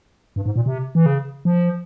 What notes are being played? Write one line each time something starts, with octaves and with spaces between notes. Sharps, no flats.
G2
G#2
A#2
C3
E3
C#3
F3